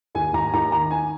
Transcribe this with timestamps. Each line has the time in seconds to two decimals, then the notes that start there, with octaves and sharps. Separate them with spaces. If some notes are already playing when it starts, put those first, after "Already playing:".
0.15 D#2 G#5
0.33 D#2 A#5
0.53 D#2 A#5
0.72 D#3 A#5
0.91 D#3 G#5